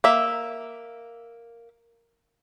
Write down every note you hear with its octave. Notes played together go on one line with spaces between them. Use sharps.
A#3 E5